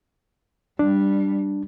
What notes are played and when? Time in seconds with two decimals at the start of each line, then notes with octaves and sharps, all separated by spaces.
0.79 G3 D4